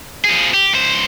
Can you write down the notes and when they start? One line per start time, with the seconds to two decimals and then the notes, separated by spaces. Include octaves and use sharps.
0.25 F3 G#4
0.54 G4
0.73 C#2 C5